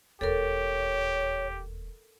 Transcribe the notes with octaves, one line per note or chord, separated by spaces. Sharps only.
E1 D#2 G4 A4 A#4 C#5